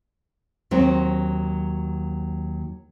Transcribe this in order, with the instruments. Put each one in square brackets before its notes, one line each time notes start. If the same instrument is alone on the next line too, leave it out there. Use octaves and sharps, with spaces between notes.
[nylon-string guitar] D#2 F#3 C4